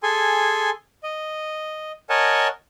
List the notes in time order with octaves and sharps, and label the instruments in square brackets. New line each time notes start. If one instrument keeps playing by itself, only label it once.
[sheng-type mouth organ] G#4 A4 G#5 C6
D#5
A#4 C#5 D#5 F#5 G#5 A5